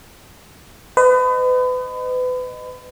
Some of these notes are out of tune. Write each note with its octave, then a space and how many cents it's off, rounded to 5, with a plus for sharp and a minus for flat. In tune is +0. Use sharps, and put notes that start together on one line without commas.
B4 +35 D#5 -20